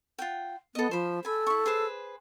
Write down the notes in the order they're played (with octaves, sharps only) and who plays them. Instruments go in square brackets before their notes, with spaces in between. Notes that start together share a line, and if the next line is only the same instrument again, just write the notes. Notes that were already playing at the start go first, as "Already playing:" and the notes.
[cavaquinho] F4 F#5 G5
[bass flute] B3 [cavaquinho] A4 D#5
[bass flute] F3 [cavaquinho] C5 B5
[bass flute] A4 [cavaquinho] G#5 B5
[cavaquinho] E4 C#6
G#4 B4 C5